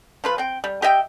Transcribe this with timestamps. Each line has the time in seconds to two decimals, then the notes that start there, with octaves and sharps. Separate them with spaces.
0.24 F3 F4 B4
0.38 C4 G5
0.64 G3
0.82 G4 D#5 E5 G5